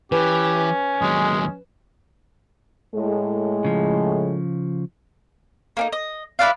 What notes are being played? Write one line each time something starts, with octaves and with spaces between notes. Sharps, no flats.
E3 C#4 G4 B4
D#2 F#3 G#3
A2 G#3
C#3 F3
A#3 D4 D#4
D#5
E4 B4 D5 F5